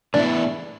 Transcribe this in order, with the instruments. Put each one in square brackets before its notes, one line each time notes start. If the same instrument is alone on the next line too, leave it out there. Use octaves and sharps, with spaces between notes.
[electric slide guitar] A2 E3 B3 E4 [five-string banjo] D4